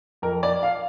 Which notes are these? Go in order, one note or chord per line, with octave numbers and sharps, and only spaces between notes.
F2 F3 A#4
D5
F5